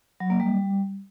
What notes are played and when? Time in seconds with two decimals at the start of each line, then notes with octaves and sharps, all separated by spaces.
0.20 F#3
0.30 A#3
0.40 G3